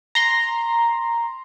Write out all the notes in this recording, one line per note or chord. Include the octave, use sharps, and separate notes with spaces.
A#5 C6